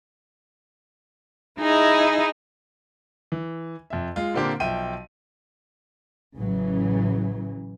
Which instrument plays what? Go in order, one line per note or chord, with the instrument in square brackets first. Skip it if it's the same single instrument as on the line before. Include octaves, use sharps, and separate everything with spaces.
[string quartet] D#4 E4 G#4 D#5
[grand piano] E3
F2 E5
G#3 F4
A#2 D3 A#3 C4 D4 G4
B1 F3 E5 G5 D#7
[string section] A1 C#3 E3 F#3